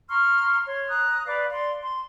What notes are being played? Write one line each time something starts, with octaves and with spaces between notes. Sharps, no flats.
A#5 C6 C#6 F6
C#5 C6
A#5 D#6 F#6
B4 D5 F5 D6
D5 F5 C6
C6